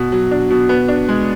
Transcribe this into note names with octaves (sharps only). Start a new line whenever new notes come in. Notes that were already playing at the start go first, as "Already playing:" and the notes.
Already playing: B2
F#3
D4
B2
B3
D4
G#3